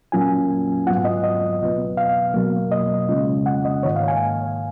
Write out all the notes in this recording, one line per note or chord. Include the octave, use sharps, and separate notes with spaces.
A#2 F#3 A#3 C#4 F4 G#5
G#2 F#3 B3 F4 F#5
D#5
D#5
C#2 B2 F#3 B3
F5
B2 F#3 A#3
D#5
C#3 G#3 C#4 F4
F#5
D#5
G#2 D#3 A#3 C#5
F5
G#5